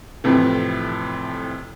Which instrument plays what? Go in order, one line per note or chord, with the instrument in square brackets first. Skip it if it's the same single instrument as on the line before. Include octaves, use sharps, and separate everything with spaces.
[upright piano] F2 A2 C3 E3